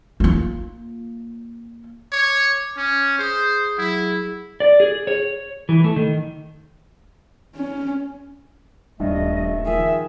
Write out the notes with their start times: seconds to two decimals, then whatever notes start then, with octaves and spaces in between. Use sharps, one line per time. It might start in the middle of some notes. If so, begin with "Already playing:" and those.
0.20 A#3 F4
2.12 C#5 D6
2.77 C#4
3.19 G#4 C5 D#6
3.78 F#3 E4 G#4
4.60 D5
4.80 G#4
5.07 C#5
5.69 E3
5.84 A3
5.96 D#3
7.55 C#4
9.00 D#1 G2 A3 D#5
9.65 D#3 F3 G#4 E5